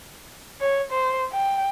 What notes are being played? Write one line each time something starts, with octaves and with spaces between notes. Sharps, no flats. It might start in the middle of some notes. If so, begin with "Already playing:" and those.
C#5
C5
G5